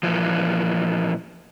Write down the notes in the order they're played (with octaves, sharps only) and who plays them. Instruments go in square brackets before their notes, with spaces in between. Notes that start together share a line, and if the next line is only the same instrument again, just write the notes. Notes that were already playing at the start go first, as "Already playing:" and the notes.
[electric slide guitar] A#2 E3 F3